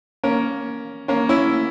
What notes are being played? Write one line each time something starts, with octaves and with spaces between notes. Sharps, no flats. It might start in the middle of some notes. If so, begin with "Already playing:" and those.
A#3 C#4
A#3 C#4
C#4 E4